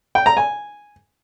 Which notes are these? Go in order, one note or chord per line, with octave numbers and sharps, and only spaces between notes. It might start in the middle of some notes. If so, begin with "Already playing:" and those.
G5
A#5
G#5